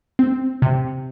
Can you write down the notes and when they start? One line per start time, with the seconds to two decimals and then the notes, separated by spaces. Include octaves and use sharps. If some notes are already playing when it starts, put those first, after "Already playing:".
0.19 C4
0.62 C3